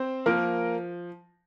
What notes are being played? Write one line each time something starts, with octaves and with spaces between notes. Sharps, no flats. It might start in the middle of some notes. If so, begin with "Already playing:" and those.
Already playing: C4 C5
F3 A#3 A#4